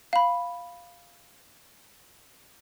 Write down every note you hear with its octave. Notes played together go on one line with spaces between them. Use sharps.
F5 B5